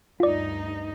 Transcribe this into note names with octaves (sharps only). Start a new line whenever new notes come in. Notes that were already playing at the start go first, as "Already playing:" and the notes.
D2 G2 D#4 F4 D5